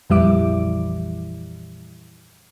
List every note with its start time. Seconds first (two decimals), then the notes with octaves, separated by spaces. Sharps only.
0.10 A#1 F2 E3 G3 E4 D6